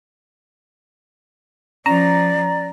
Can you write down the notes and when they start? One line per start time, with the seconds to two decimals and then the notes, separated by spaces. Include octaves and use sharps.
1.86 F3 C#4 D5 A#5